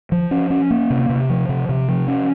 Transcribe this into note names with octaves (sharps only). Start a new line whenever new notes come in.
F3
C#4
C#4
A#3
C3
C3
F3
C3
C3
F3
C#4